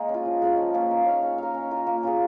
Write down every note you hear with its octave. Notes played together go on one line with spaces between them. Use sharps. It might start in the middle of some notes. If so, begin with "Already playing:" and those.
Already playing: G#3 A#3 D#4 G#4 A#4 D#5
C#4
F4
F3
G#3 C#4 F4
F3
A#3 C#4
D#4
C#5 F5
C#4
A#4 F5
C#4
F4 A#4
A#3
C#4 F4 G#4